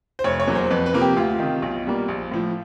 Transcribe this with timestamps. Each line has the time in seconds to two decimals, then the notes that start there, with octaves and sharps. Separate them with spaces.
0.19 C5
0.24 F1 C#5
0.40 C#5
0.47 E2 B2 F#3 A#3
0.55 C5
0.71 F2 B4
0.86 B4
0.94 C3 F3 A#3
1.01 G4
1.16 D2 F4
1.39 C3 D#3
1.62 B1
1.85 B2 G3 A#3
2.08 A#1
2.31 A2 F3